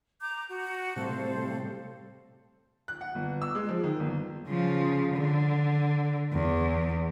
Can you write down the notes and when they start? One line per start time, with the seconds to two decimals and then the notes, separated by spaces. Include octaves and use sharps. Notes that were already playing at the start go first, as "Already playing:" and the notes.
0.21 A#5 D6 G6
0.48 F#4
0.96 A2 C3 G3 A4 C5 F5
2.88 F#6
3.01 F#5
3.15 G1
3.42 E6
3.55 G#3
3.69 F3
3.83 D#3
4.00 G1
4.48 C#3 F3
5.14 D3
6.33 E2